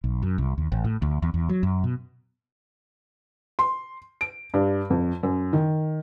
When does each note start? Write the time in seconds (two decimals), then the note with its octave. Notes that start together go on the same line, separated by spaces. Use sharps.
0.04 B1
0.22 F#2
0.38 C2
0.58 D#2
0.72 A1
0.84 A2
1.02 D2
1.22 E2
1.34 E2
1.49 F#3
1.63 F#2
1.84 B2
3.59 C6
4.21 D7
4.54 G2
4.90 F2
5.23 F#2
5.53 D#3